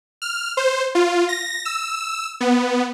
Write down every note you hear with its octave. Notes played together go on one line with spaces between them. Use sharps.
F6
C5
F4
A#6
E6
B3